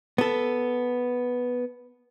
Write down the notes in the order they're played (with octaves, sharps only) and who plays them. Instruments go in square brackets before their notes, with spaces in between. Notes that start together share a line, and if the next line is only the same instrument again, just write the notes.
[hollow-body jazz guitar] B3 A4